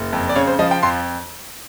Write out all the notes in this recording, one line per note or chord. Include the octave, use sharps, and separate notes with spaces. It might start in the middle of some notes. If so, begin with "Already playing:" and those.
Already playing: F#1
F2
D5
C#3 C#5
C5
F3 D#5
G5
F2 C6